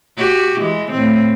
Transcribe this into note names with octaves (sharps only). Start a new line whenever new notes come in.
F#4 G4
E3 G#3
A2 C4